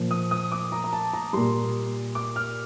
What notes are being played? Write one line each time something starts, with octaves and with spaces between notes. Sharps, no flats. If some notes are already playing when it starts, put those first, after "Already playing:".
Already playing: A#2 F3
D#6
D#6
D6
A#5
A#5
A5
A#5
A#2 G3 C6
D6
F6